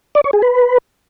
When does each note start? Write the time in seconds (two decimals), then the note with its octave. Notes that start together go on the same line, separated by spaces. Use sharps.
0.15 D5
0.24 C#5
0.33 G#4
0.42 B4